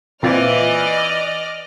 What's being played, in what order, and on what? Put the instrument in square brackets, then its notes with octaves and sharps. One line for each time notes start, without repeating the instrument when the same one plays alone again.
[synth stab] A#2 C4 F4 [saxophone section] E3 [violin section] D5 D#5 F6